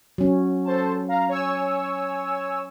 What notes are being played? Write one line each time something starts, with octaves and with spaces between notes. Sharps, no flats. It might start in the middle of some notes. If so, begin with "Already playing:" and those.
F#3 C#4
A4 C5 A5
F5 A#5
C#5 G#5 E6